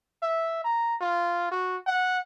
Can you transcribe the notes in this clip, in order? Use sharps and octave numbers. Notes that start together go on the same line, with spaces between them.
E5
A#5
F4
F#4
F#5